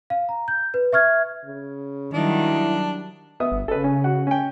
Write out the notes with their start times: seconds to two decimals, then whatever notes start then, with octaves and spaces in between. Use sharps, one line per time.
0.10 F5
0.29 A#5
0.48 G6
0.74 B4
0.93 E5 C#6 F6 G#6
1.45 C#3
2.13 D#3 F#3 G3 D4 E4
3.40 B3 E5 D#6
3.52 G1
3.68 C#3 A4 B4
3.84 C#4
4.04 F#4 F#5
4.27 C#4 G5